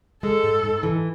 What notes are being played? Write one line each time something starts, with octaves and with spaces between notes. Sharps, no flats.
G#3 A4
G#2
G#2
E3